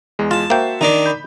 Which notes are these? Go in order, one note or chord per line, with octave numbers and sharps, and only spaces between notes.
E2 G#3
F4 A5
A#3 F#4 C5 E5 G5
D#3 D4 A#5
B5 G6